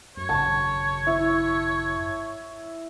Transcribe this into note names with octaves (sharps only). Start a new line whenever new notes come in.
F#2 C#5
G#1 F#2 C#3 A5
E4